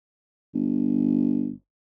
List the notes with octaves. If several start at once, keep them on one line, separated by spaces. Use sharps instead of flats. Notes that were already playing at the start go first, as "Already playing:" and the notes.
G1